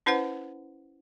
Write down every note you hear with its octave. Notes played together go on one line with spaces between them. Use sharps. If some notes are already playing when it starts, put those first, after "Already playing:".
C#4 E4 B4 C5 F#5